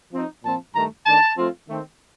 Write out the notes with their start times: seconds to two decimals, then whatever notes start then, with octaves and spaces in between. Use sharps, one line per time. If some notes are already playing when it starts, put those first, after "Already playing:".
0.12 F3 C4 D#4
0.43 A#2 F3 C4 A5
0.74 G2 D#3 A3 A#5
1.06 D#3 A3 D4 A5
1.36 F3 A3 C4 F4
1.68 D#3 A3 C4